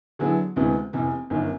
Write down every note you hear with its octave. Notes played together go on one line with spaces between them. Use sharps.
D3 F#3 B3 E4 G#4
D2 C3 E3 G#3 B3
F1 E2 C3
G1 F#2 D#3